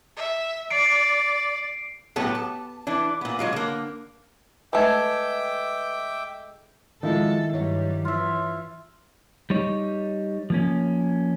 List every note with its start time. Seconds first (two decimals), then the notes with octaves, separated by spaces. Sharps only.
0.16 E5
0.71 D5 C7 D7
2.16 A2 F#3 B3 G4 A4
2.35 A5
2.87 E3 D4
3.21 A#2 B3
3.39 F#3 G#3 F4
3.53 D3 A#3
4.73 G#3 A3 B4 E5 G5 D6 E6 G#6
7.03 D#3 F3 G#3 D#4 E4 A4
7.53 G2 F#3 G3 C#5
8.05 E3 F4 E5
9.50 G3 D#4 C#5
10.50 F3 A#3 C#4